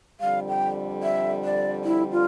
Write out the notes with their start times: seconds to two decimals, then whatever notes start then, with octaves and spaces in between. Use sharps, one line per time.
0.21 F2 D3 G3 F5
0.49 G5
1.03 E5
1.44 D5
1.85 E4
2.12 F4